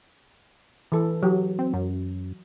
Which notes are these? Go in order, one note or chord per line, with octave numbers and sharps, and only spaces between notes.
E3 A4
F#3 G4
C4
F#2